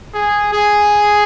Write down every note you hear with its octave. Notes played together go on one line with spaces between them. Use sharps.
G#4
G#4